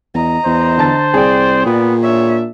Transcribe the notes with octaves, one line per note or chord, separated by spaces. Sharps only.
E2 D#5 A#5
E2 C5
D3 A5 A6
C2 G#4 D5 G5
A#2 B3
D4 C#5 E5